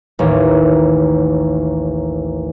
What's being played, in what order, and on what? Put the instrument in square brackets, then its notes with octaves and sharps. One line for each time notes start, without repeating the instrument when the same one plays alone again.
[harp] A1 D#2